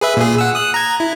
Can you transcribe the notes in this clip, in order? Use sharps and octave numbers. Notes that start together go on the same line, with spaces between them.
G#4 B4 E5
A#2 G#4
F#5 E6
D#6 F#6
A#5 G#6
E4